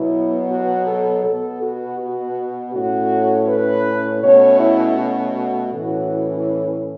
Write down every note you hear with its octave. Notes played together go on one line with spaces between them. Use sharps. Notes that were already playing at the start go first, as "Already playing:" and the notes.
Already playing: B2 F#3 B3 E4
F#4
A4
B2 B3 A4
F#4
F#4
A2 A3 C#4 F#4
B4
B2 A3 C#4 C#5
E4
F#4
A2 E3 C#4